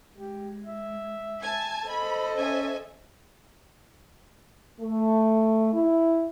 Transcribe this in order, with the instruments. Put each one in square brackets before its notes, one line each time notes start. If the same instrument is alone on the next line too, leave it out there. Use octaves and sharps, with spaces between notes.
[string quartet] G#3 [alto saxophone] G4
[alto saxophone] E5
[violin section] G#5 A5 G#6
[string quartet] A4 C5 D#5 [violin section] B5
[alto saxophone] C#4 [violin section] E5 G#5
[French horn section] A3
E4